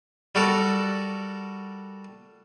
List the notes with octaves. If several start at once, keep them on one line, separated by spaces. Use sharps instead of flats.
G3 F#4 A4 A#4